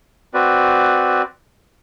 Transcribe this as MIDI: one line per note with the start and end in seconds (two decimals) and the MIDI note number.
0.34 1.22 60
0.34 1.22 66
0.34 1.22 71
0.34 1.22 74